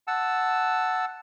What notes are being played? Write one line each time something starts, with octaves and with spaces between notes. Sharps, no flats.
F#5 A5 E6